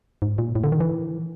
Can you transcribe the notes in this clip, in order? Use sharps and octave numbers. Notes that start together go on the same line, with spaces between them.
G#2
A#2
A2
D3
D#3
E3